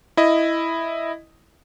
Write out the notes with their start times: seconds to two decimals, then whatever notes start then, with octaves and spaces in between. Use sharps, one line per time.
0.17 E4 D#5